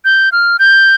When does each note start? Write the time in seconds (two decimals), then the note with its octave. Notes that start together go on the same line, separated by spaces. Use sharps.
0.05 G6
0.32 F6
0.59 G6